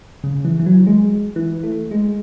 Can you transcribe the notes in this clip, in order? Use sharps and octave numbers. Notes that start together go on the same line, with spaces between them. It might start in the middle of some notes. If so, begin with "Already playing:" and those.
C#3
E3
E3
F#3
G#3
E3
A3
G#3